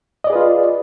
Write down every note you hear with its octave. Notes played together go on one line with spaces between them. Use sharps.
F4 G#4 B4 D5 D#5